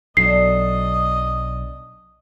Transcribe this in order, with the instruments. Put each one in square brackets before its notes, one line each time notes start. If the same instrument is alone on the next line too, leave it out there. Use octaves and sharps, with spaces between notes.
[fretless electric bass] B1 F#3 [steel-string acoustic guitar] D4 A4 [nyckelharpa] D#5 [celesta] C7